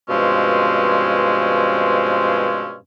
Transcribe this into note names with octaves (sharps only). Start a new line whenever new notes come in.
G2 B2 F3 G#3 C4 C#4